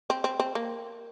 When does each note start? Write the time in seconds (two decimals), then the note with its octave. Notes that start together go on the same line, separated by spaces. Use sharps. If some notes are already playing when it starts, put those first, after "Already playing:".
0.10 C4
0.24 C4
0.40 C4
0.55 A#3